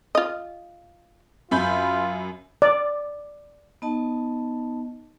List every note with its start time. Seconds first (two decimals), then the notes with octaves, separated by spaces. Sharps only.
0.15 F4 D#5
1.51 F#2 F4 B5 G6
2.62 D5
3.82 B3 D#4 D#5 A5